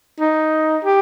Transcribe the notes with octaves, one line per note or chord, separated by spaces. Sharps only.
D#4
G4